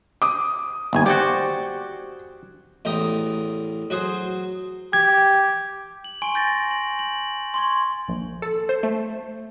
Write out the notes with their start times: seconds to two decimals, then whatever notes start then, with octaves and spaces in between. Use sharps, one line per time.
0.22 D6 D#6
0.93 G1 D#2 G#5
1.06 F#4 G4 C5 D5
2.85 A1 E2 G5 A#5 D#6
3.90 F#3 F#4 G#4 C5
4.93 G4 G#6
6.04 F#7
6.22 G#5 C6 C#6 D7
6.35 G6 A6 A#6
6.71 F#7
6.99 F#7
7.54 C6 C#6 G#6
8.08 A#1
8.42 A4
8.69 C5
8.83 A3